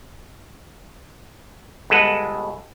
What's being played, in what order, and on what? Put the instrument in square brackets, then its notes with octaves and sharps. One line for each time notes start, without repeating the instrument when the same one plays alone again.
[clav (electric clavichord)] G1 G#3 A4 B4 F#5